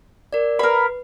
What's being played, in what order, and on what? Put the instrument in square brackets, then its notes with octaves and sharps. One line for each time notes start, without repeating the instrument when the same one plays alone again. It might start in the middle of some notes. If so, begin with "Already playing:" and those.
[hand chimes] A#4 D5
[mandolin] A#4 B5 [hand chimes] B4